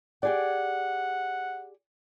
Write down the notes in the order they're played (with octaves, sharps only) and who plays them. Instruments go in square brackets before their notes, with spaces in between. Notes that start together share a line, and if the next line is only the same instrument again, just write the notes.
[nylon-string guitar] G4 G#4 D5 [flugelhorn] F#5